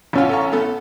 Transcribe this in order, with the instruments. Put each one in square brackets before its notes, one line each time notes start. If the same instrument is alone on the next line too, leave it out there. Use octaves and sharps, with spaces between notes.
[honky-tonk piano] A1 C#4 F5 [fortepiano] B3 F4
[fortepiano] A4 A#5 C#6
A3 B3 A4